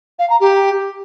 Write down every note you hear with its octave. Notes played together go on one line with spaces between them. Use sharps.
F5
A#5
G4